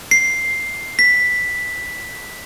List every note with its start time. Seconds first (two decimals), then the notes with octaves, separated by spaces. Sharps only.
0.11 C7
0.99 B6